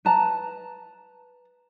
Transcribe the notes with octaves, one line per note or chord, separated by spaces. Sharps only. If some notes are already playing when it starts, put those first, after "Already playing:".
B4 A5 A#5